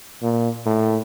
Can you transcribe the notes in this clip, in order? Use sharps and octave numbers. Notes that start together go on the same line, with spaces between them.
A#2
A2